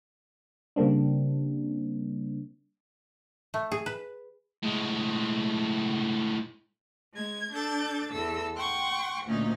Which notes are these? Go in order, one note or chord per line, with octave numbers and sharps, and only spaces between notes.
C#3 G3 A#3 C4 D4
A3
G#4
B4
A2 G#3
G#3 G#6
D4 A4 G6 A6
E2 A4 E6
F#5 G5 C6 C#6
D2 A#2 C#4 D#4